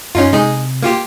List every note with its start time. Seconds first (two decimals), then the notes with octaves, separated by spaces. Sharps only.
0.15 F#2 C#4 D#4 F4
0.33 C3 G#3 D#4 G#4
0.82 A#3 F4 G4